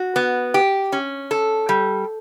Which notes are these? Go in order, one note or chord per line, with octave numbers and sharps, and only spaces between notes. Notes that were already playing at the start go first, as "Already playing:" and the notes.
Already playing: F#4
B3
G4
C#4
A4
G3